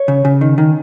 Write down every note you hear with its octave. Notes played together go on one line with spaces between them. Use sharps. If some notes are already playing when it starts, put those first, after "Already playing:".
Already playing: C#5
C#3
C#3
D#3
D#3